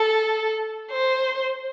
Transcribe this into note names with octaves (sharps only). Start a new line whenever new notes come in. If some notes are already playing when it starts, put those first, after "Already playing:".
Already playing: A4
C5